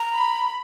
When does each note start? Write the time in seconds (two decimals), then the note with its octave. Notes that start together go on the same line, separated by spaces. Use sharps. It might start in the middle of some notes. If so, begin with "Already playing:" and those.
Already playing: A#5
0.14 B5